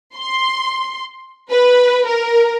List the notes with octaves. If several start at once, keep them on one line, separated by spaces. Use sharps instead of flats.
C6
B4
A#4